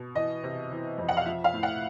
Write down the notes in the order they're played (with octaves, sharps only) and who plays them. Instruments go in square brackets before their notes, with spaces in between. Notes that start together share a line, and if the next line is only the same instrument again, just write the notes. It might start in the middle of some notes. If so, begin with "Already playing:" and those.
Already playing: [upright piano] B2
E3 D#5
C3
E3
F2
F#5
F5
F3 E5
F5
A2
F#5